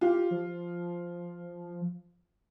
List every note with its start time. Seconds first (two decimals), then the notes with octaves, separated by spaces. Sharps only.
0.01 F4 G4
0.31 F3